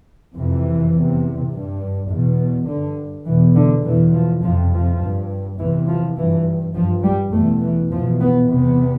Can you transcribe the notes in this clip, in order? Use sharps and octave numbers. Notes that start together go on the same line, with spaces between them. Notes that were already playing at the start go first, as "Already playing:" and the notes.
F2 C3 E3
E2 C3
G2
E2 B2
G2 D3
E2 B2 E3
D3
E2 B2 E3
F3
F2 C3 F3
F3
G2
E2 C3 E3
F3
G2 E3
G2 F3
G3
E2 B2 A3
E3
E2 B2 F3
B3
E2 C3 B3